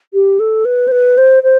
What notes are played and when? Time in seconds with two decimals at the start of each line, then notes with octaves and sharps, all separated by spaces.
0.14 G4
0.39 A4
0.65 B4
0.88 C5
0.92 B4
1.18 C5
1.43 C5